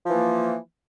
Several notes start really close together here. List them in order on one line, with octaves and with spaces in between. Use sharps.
F3 E3 A#3